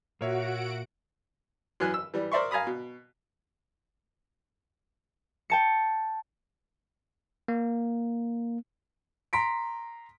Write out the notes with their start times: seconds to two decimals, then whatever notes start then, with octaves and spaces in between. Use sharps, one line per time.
0.21 A#2 A#3 F#4 A#4 C#5 E5 F#5 D7
1.80 F#2 E3 G#5 F#6
1.94 E6
2.14 E3 G3
2.32 A#4 C5 D5 E5 C6 C#6
2.51 F5 G#5 A#5 B5 D#6
2.67 B2
5.50 G5 A5 C#7
7.48 A#3
9.33 A#5 C6 B6 D7